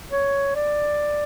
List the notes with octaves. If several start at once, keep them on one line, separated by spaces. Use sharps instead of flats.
C#5
D5